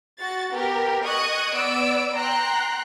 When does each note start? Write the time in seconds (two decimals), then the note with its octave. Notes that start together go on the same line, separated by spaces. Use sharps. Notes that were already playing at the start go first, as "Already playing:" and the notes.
0.19 F#4 A6
0.52 B3 G4 A#4
1.05 D#5 C#6 D#6 F#6 G#6
1.54 B3 D5 E6 D7
2.14 G5 A#5 C6 F#6